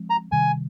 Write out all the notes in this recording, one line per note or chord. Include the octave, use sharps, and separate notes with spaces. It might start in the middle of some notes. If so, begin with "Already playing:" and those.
Already playing: F3 G#3 C4
A#5
C3 D#3 G3 G#5